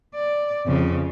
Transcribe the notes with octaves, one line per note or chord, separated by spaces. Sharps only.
D5
F2 C#3